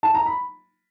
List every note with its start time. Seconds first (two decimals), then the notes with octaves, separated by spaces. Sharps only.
0.03 A5
0.15 A#5
0.26 B5